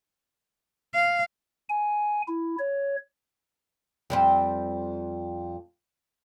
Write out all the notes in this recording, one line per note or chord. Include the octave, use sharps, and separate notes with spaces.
F5
G#5
E4
C#5
F2 G3 C4